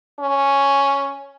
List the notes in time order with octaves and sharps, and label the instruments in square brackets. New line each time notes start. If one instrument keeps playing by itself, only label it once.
[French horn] C#4